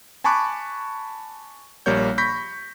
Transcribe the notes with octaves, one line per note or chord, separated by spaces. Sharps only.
G#5 A5 B5 C#6 D6 F#6
A#1 G3 A#3 C#5 G6
B5 C#6 G6 A#6 B6